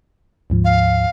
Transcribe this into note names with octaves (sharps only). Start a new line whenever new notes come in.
D2 G#2 F3
F5